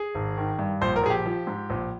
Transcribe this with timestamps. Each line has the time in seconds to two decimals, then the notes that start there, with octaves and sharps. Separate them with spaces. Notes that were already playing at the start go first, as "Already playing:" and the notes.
Already playing: G#4
0.15 G#1
0.37 D#3
0.59 G2
0.82 A#1 C5
0.96 A#4
1.03 A#1 G#4
1.10 G4
1.26 F3
1.47 G#2
1.70 A#1